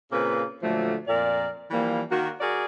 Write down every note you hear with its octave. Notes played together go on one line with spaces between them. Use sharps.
A#2 C#3 A#3 C4 B4
A#2 D3 F3 F#3 A3
F2 A#2 A#4 D5
E3 F3 G3 A#3
D#3 A#3 F#4
F#4 G#4 A#4 D5